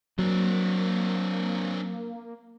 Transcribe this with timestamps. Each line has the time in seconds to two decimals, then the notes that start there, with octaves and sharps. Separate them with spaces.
0.19 F#3 A#3 C4 D4